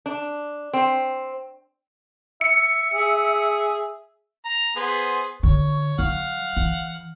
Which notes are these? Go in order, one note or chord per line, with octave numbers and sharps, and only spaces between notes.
D4
C4
E5 C#7
G#4
A#5
B3 G#4 C5
D3 C#5
F#3 F5 F#5
E3